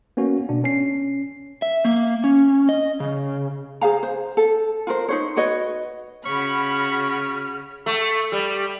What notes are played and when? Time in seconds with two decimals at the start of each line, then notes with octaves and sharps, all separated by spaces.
0.17 A#3 B3 C#4 F#4
0.49 B2 D4
0.64 C#4 C7
1.62 E5
1.85 A#3
2.24 C#4
2.69 D#5
3.00 C#3
3.81 G#4 C5 F5 A#5
4.03 C5
4.37 A4
4.87 F4 A#4 C5
5.09 D#4 C5 C#5
5.36 F#4 B4 C#5 D#5
6.25 C#3 F#4 B5 C#6 F6
7.86 A3
8.32 G3